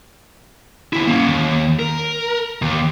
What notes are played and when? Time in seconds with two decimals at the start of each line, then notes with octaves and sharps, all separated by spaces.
0.93 D#2 E4
1.07 A#3 C#4
1.26 D#2
1.79 A#4
2.62 D#2